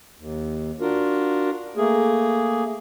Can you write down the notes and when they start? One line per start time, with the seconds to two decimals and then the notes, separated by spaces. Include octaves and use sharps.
0.18 D#2
0.80 D4 F4 F#4 A#4
1.77 A3 A#3 G#4